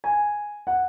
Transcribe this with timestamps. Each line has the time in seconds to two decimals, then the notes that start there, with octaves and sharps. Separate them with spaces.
0.04 G#5
0.67 F#5